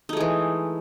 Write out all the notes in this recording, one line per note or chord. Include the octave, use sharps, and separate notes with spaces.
E3 G#3 A3 D#4